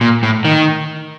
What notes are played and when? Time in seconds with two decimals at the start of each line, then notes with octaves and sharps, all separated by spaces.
0.01 A#2
0.23 A2
0.45 D#3